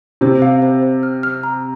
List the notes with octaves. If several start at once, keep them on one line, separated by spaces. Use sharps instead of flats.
C3 C5
F5
C5
C5
F6
F6
A#5